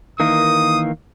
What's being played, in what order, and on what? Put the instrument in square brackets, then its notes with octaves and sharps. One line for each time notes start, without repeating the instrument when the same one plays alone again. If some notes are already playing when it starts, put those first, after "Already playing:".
[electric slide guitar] D#3 E3 A#3 [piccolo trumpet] D#6